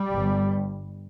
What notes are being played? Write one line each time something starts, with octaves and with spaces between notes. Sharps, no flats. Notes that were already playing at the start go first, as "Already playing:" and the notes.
Already playing: G3
G1 G2